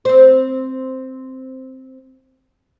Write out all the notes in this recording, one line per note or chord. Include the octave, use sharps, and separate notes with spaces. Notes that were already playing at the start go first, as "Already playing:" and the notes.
C4 C5